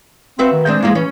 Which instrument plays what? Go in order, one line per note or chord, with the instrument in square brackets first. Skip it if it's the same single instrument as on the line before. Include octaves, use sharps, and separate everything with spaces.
[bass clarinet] C4 [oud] F#4 B4 E5
[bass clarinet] D#3
[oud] G#3 C4 D4
[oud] E3 F3 G#3 [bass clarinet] A#3
[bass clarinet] E3 [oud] C#4